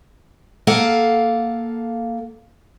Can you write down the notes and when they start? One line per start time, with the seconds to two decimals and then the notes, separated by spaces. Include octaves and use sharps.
0.67 A#3 A4 F5 F#5